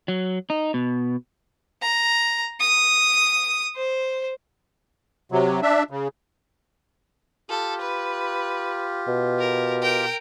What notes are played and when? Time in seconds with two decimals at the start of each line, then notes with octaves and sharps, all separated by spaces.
0.08 F#3
0.50 D#4
0.74 B2
1.82 A#5
2.61 D#6
3.76 C5
5.32 C3 F#3
5.62 D4 E5
5.91 C#3
7.49 F4 G4 A4
7.81 B4
9.07 B2
9.39 A#4
9.82 A#4 G5